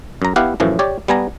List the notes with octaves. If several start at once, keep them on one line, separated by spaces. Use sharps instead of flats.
F#2 A#5
B3 E4 G4 F5 F#5
F#2 A2 E3 F3
G4 C#5 D5
G3 B3 G#5 A#5